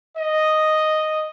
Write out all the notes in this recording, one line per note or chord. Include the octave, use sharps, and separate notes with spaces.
D#5